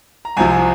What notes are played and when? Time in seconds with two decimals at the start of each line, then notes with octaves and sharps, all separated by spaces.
0.25 A#5
0.37 C2 C3 F3 G#5